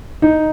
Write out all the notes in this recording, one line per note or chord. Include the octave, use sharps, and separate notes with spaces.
D#4